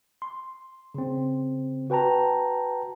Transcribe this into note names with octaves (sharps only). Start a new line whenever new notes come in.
C6
C#3 C4
F#4 B4 G5 A5 A#5